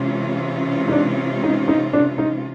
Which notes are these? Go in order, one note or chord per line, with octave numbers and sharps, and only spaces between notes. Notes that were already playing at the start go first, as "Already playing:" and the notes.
Already playing: C3 E3 G#3 C#4 F4
D#4
D4
D#4
D#4
D4
D#4